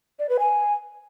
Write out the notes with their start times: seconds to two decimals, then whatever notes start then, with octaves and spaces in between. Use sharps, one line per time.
0.19 D5
0.29 B4
0.39 G#5